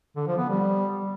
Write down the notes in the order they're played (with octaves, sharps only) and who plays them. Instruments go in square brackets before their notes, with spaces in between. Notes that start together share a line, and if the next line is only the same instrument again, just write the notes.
[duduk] D3
F3
B3
G3